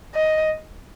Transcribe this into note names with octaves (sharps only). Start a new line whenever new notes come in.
D#5